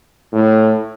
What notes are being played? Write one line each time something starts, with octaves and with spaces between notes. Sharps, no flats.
A2